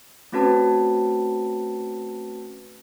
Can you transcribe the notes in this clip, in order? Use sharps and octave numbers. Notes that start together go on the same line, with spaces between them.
A3 C4 C#4 F#4 B4 A5